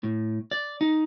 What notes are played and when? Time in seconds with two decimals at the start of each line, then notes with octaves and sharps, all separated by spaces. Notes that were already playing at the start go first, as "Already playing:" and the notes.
0.03 A2
0.51 D5
0.81 D#4